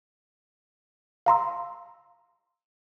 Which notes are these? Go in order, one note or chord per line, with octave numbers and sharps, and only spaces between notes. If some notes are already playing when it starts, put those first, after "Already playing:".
F5 A#5 C6 E6